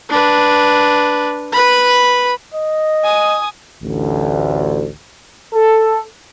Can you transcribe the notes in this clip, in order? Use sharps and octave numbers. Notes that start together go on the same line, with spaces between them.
D4 B4
B4 B5
D#5
G#5 D#6
A1 D2
A4